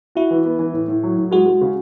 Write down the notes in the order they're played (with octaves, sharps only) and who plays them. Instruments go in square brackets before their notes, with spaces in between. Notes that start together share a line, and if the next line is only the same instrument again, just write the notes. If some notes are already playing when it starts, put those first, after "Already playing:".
[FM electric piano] E4 [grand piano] F#4
[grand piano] E3
B3
E3
A2
A2
F#3
A2
[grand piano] G#3 [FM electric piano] F#4
[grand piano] G#3
C#3